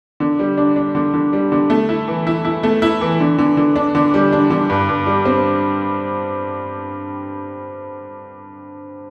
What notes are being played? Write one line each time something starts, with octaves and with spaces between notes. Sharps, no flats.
D3
G3
D4
D4
D3
D3
G3
D3
A3
E4
E3
E4
E4
A3
E4
E3
D3
D3
D3
D4
D3
G3
D4
D3
G2
G2
G3
C4